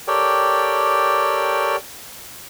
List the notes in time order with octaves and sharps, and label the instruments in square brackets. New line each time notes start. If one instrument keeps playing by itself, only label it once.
[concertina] G4 A4 A#4 C#5 D5 G5